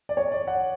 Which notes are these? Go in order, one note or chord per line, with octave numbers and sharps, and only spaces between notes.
D5
C#5
D5
F#5